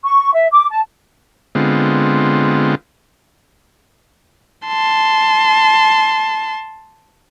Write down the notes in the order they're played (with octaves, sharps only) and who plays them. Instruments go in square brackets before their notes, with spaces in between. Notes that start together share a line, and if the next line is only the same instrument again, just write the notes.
[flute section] C#6
E5
D6
A5
[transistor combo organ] D3 G#3 B3 C4 F4
[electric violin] A5 C6